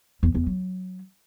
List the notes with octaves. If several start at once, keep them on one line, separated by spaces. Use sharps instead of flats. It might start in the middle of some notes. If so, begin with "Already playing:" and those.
E2
E2
F#3